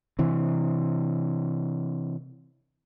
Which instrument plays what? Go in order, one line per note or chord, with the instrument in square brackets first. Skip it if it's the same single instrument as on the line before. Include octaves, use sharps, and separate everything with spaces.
[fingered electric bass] C3 E3